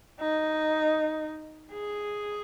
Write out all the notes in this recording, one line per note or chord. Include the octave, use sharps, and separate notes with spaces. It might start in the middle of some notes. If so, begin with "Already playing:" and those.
D#4
G#4